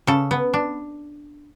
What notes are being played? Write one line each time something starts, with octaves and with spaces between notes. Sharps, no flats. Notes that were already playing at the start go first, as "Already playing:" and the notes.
C#3 A4
B3
D4